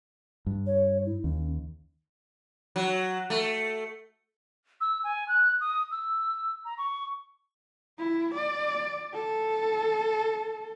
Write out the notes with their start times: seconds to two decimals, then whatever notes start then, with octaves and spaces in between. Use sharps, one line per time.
0.46 G2
0.67 C#5
1.06 E4
1.24 D#2 C#4
2.76 F#3
3.30 A3
4.81 E6
5.04 G#5
5.28 F#6
5.60 D#6
5.91 E6
6.65 A#5
6.78 C#6
7.99 E4
8.35 D5
9.13 A4